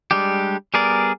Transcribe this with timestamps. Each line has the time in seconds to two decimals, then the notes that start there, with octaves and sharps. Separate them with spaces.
0.11 G3 G#3 D4 G4
0.74 G3 B3 G#4 A#4 D5